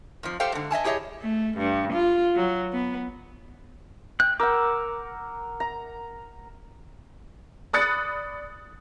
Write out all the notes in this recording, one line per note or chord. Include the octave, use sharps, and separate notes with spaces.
F2 F3
G4 A4 C5 F5 G5
G#2 D3
D#5 E5 G#5 A5
E4 G4 G#4 C#5 D#5
A3
G2
F4
F#3
B3
G5 F#6
A#4 F#5 D6 E6
A#5
D5 B5 D#6 F#6 A6 C#7